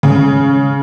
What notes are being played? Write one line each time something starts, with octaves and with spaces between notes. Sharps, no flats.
C#3